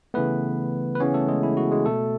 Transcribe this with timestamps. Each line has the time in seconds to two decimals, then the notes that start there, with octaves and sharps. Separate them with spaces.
0.14 C#3 E3 A3 B3 B4
0.95 B4
1.00 C#3 E3 B3 C#4 C#5
1.14 A3 A4
1.28 G#3 G#4
1.43 E4
1.57 F#4
1.71 G#3 G#4
1.86 B2 A3 A4